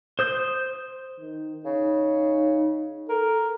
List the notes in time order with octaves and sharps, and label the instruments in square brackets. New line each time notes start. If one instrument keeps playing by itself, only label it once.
[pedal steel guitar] C5 D#6 G6
[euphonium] D#3
[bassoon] C#3 [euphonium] D#4
[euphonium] A4 [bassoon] A#4